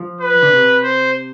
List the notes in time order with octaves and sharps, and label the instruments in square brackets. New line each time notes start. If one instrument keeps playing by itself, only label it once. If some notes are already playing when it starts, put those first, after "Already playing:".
Already playing: [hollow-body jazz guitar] F3
[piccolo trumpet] B4
[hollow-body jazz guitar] D3
C3
[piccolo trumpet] C5